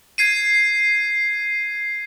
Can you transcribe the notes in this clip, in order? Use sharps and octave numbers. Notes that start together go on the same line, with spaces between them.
G#6 C7 D#7